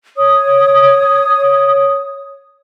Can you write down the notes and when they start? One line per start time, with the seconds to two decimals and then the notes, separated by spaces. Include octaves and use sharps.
0.17 C#5 D#6